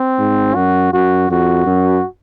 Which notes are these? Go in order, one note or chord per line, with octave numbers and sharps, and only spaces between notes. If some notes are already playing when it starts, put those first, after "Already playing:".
Already playing: C4
G#2
F#2 F#4
F#2 F#4
F2 F#4
F#2